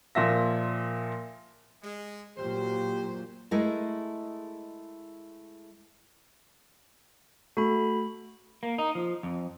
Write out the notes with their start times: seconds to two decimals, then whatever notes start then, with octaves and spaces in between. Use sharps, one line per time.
0.15 A#2 F3 E5 A#6
1.83 G#3
2.38 A#2 F#3 G4 C5
3.51 G#3 A3 E4 G#4 A#4
7.57 A3 F#4 B5
8.63 A#3
8.78 D#4
8.95 F3
9.23 F2